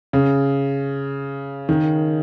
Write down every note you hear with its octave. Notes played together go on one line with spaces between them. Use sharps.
C#3
D#3